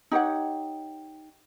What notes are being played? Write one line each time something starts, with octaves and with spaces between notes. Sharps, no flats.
D#4 G4 C#5 F#5